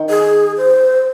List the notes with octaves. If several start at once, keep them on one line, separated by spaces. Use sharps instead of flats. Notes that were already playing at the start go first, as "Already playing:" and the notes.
Already playing: D#3
G#4
C5